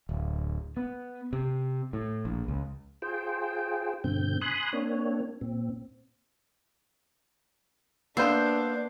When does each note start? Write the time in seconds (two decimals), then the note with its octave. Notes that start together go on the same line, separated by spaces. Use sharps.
0.09 D1
0.77 B3
1.33 C3
1.93 A2
2.25 A#1
2.48 C#2
3.02 F4 G#4 C5 G5
4.04 G2 B2 D3 C4 G6
4.41 G#5 B5 C6 D#6 F#6
4.73 A#3 C4 D4 C#5
5.41 A#2 C4
8.17 A#3 B3 D4 C5 F5 E6 G6 C7